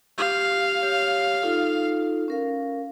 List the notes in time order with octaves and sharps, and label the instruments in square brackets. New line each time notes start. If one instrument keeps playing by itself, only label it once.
[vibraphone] G4 [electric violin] F5
[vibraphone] G4 C#5
D#4 F4 A4
C#4 A#4 F5